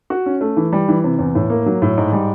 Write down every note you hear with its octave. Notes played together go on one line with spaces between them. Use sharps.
F#4
C#4
A3
E3
G3
E3
C3
E2
A2
A#3
F#3
A2
G#2
G3